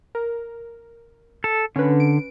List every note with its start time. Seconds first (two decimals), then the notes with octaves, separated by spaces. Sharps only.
0.15 A#4
1.44 A4
1.76 D3 C#4 B4
2.00 D7